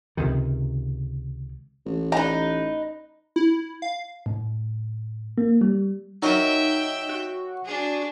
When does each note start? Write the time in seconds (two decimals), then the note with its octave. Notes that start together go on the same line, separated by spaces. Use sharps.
0.17 C#2 C3 D#3
1.86 A1
2.12 D#4 B4 A#5
3.36 E4
3.82 F5
4.26 A2
5.38 A#3
5.61 G3
6.23 F#3 D#4 A#4 D#5 E5 G5
7.09 F#4
7.65 D4 G#4